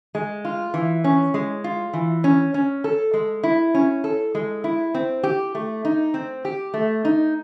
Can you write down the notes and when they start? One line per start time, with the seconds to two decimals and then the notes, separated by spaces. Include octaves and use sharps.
0.15 G#3
0.45 F4
0.74 E3
1.04 C#4
1.34 G#3
1.64 F4
1.93 E3
2.24 C#4
2.54 C#4
2.84 A4
3.14 G#3
3.43 E4
3.75 C#4
4.04 A4
4.35 G#3
4.64 E4
4.95 C4
5.24 G4
5.55 A3
5.85 D#4
6.14 C4
6.45 G4
6.74 A3
7.05 D#4